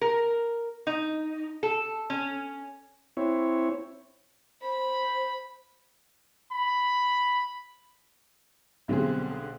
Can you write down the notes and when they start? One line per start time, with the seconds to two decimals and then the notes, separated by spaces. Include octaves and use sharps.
0.01 A#4
0.87 D#4
1.63 A4
2.10 C#4
3.17 C4 E4 C#5
4.62 C5 B5
6.52 B5
8.88 B1 D3 G3 C4 C#4 G#4